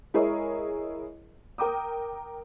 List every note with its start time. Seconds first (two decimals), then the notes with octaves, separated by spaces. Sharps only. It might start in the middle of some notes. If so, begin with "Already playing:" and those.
0.14 G#3 E4 G#4 A#4 C#5 D#5
1.58 A#4 G5 A#5 D6 D#6